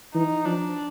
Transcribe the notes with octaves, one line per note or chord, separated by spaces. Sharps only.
E3 D#4
F3 D4